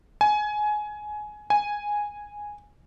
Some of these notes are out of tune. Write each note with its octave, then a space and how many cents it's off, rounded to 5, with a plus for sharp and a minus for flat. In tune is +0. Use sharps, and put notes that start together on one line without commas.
G#5 +20
G#5 -5